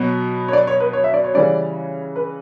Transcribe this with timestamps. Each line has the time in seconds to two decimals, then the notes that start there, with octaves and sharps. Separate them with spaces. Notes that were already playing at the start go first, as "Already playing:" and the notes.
Already playing: B2 F#3 B3
0.48 C#5
0.53 D5
0.67 C#5
0.80 B4
0.93 C#5
1.04 E5
1.14 D5
1.24 C#5
1.34 C#3 E3 G3 C#4 D5
2.16 B4